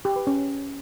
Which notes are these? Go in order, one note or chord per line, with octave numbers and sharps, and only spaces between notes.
G4
B4
C#4